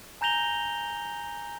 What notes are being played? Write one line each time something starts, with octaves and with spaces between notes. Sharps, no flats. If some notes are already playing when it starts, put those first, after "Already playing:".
G#5 A#5 G6 A#6 F7 G7